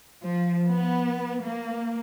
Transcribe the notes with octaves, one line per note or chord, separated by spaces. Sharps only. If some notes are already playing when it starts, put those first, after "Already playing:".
F3
B3
A#3